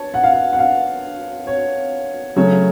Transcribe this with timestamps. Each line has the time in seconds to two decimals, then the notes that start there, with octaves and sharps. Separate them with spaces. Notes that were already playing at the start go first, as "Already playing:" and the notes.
Already playing: C#5 A5
0.14 F#5
0.23 F5
0.33 F#5
0.53 F#5
0.59 F5
1.47 C#5
2.36 C#3 F#3 A3 C#5